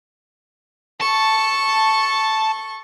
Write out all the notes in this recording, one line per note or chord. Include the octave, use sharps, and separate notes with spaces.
A4 A5 C#6